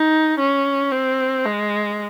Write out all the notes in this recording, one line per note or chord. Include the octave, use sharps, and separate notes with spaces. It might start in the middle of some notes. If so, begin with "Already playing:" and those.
Already playing: D#4
C#4
C4
G#3